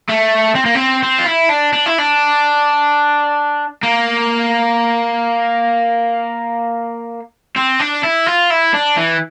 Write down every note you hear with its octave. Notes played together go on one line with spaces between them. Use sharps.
A3
C4
A#3
C4
C4
F4
E4
D4
D4
E4
D4
A#3
C4
D4
E4
F4
E4
D4
E3